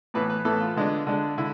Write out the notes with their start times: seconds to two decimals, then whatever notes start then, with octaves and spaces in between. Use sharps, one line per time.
0.14 A2 E3 B3 B4
0.30 B4
0.45 A2 E3 B3 A4
0.60 F4
0.77 D3 G#3 D4
1.07 D3 G#3 D4
1.38 D3 E4